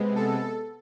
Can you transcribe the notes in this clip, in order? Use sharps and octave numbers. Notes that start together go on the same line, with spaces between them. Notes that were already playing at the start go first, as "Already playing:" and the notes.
Already playing: C3 G#3 B3
A4